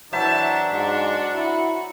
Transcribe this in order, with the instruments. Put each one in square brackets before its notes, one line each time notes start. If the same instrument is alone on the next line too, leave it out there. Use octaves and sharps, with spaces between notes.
[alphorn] E3 [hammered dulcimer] F#3 C5 E5 [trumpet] D4 [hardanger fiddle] E4 A5
[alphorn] G#2 [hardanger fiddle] F#4
[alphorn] E4 [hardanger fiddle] F#4